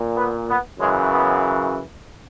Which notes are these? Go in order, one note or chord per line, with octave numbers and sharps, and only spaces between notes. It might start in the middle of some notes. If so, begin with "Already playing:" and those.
Already playing: A#2
B3
B3
F#2 C#3 E3 G#3
B3